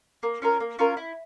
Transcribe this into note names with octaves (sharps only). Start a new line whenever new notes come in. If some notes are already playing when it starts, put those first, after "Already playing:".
A#3
C#4 F4 A#4
A#3
C#4 F4 A#4
E4